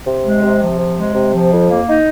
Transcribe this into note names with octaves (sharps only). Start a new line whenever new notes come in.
C3
G#3
C3
F3
C3
G#3
C3
F3
F2
A#3
D#4